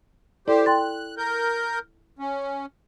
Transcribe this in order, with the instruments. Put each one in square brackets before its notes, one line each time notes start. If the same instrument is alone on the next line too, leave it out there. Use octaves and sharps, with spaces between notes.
[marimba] E4 A4 D5 [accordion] G4 C5
[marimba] G5 C6 A6 [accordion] F#6
[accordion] A#4 G6
C#4